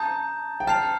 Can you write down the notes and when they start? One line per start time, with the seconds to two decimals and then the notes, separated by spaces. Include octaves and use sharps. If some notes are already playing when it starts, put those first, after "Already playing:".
Already playing: A5 A#5 D#6 G6
0.60 G5
0.67 A5 F6 C7 F7